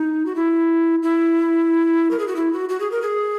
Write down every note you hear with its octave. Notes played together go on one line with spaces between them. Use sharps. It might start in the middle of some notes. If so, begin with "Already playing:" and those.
Already playing: D#4
F#4
E4
E4
A#4
G#4
F#4
E4
F#4
F#4
G#4
A#4
G#4